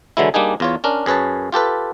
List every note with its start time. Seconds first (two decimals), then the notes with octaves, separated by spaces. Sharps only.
0.17 D3 E3 F#3 G#3 E4
0.34 G3 A#3 D4 D#4 G#4
0.60 E2 F4 C#5
0.84 C#4 D4 A#4
1.06 F#2 G#4 B4 C#5 A5
1.52 F4 G4 A4 B4